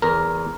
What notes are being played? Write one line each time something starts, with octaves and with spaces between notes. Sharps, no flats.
E2 A#4